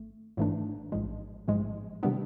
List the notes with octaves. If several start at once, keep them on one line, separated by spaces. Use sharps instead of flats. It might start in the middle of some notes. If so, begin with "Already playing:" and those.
Already playing: G#1 A3
G#1 G#2 E3 A3 D4
A1 G#2 F3 G#3
A1 G#2 F3 G#3
C3 D#3 G3 B3 D4